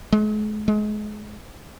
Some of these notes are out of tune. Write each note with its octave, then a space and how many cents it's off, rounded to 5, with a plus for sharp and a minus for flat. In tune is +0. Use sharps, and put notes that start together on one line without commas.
G#3 +40
G#3 +30